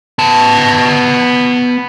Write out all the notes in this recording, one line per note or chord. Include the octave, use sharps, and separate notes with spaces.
B3 A5